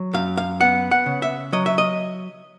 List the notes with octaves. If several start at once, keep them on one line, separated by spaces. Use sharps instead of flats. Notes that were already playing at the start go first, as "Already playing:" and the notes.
Already playing: F#3
F#2 F5
F5
B3 F#5
F#5
C#3
E5
F#3 D#5
E5
D#5